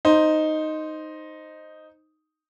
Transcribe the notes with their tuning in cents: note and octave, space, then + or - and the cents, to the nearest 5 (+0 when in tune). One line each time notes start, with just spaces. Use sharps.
D#4 +0 C5 +0